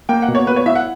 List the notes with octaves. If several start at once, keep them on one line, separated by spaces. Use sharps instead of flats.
A#3 G5
F#5
B2
C#5
B3 B4
C#5
E4 E5
F#5